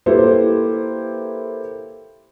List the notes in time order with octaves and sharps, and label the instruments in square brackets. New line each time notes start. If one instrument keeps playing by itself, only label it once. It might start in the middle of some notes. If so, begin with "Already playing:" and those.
[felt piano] A#3 E4 G4 A4 B4 C5